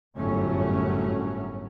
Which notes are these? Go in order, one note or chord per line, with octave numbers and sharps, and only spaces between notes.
G1 F#2 A2 F#3 A3 C#4